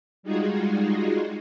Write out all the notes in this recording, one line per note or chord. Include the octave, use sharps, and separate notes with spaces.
G3 G#3 D#4 F4 F#4 G#4